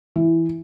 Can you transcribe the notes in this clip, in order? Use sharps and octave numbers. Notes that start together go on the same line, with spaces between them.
E3